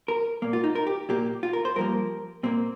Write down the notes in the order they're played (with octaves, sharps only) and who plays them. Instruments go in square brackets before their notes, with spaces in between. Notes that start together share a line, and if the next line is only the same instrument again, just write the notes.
[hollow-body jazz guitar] A#4
A#2 A#3
F4
D#4
A#4
G4
A#2 A#3 G4
F4
A#4
C5
G2 F3 A#3 A#4
A#2 A#3 C4